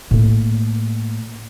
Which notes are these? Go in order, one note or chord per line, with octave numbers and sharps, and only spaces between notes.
A2 A#3